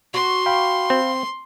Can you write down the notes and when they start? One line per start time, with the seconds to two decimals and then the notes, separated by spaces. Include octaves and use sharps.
0.14 F#4 C6
0.46 F5 G5 B5
0.90 C4